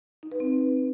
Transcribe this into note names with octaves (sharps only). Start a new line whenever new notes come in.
D#4
B4
C4